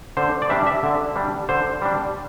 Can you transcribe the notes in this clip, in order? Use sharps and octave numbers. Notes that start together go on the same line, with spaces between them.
D3 C5
D5
G3 D4 E5
E5
D3
G3 D4
D3 C5
G3 D4